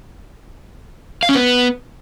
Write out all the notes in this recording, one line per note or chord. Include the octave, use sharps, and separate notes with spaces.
F5
C#4
B3